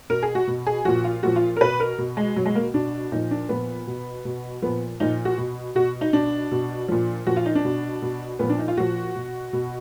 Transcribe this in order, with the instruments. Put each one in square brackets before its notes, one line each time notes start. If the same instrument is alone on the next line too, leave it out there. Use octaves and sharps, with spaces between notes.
[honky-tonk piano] B2 A#4
G#4
F#4
B2
G#4
A#2 F3 F#4
F4
A#2 F3 F#4
F4
A#4
B2 B4
A#4
B2
G#3
B2 F#3
G#3
A#3
B2 D4
A#2 F3 D#4
D4
A#2 F3 B3
B2
B2
A#2 F3 B3
A#2 F3 D#4
F#4
B2
B2 F#4
D#4
B2 D4
B2
A#2 F3
A#2 F3 F#4
F4
D#4
D4
B2
B2
A#2 F3 B3
D4
D#4
F4
A#2 F3 F#4
B2
B2